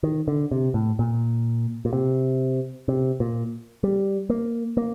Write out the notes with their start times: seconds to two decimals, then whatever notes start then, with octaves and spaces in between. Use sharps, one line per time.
0.03 D#3
0.28 D3
0.51 C3
0.74 A2
0.99 A#2
1.85 A#2
1.93 C3
2.88 C3
3.20 A#2
3.83 G3
4.30 A#3
4.77 A#3